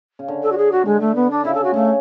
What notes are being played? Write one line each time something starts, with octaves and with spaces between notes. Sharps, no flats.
C#3
D3
A4
F#4
G#4
F#4
D3 G#3
A3
B3
D4
C#3 E4
A4
F#4
C#3 A3